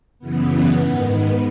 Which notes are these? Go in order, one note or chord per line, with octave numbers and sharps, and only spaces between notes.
F#2 C#3 E3 B3
G#2 D#3
B3